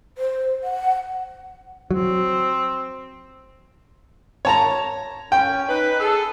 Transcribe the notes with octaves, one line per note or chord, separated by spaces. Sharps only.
C5
F#5
F#3 C4
C#5 A5 A#5
C#4 G5
D#4 B4
G#4 A4